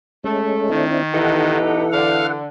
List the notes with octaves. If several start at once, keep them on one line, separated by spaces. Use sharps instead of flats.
G#3 A3 C#4
D#3 C4 D4 E4
B2 E3 D#4 G4 A4 F#5
D3 F5